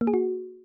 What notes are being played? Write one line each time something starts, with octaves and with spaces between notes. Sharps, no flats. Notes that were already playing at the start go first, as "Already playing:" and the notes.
A#3
G#4
F#4